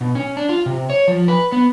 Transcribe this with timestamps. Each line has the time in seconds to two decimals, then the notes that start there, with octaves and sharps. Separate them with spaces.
0.01 B2
0.15 C#4
0.37 D4
0.49 F4
0.66 C3
0.90 C#5
1.08 F3
1.28 B4
1.52 B3